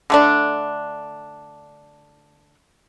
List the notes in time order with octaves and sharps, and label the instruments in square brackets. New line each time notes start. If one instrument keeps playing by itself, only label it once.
[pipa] D3 A3 D4